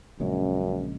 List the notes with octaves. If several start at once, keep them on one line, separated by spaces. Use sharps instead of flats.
A#1 F#2 C#3 G#3